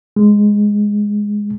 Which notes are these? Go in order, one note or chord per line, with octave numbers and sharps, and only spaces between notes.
G#3